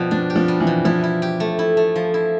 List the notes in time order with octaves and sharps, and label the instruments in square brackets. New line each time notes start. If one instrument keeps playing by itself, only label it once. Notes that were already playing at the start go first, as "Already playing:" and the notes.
Already playing: [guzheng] B2 G3 [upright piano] F3
[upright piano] F3 [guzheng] D4
[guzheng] G4
[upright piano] F3
[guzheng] G3
[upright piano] E3
[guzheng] B2
[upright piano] F3 [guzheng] E4
[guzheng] E4
G4
A3
E4
A3
F3
E4